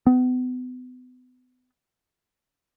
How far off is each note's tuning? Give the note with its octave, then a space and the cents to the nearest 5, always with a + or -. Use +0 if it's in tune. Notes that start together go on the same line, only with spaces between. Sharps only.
B3 +35